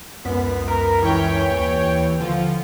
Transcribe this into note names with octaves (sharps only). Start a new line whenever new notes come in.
C#2 F#2 B3 B6
A#4
E3 C#5 G5
D#2
D3 F3 F4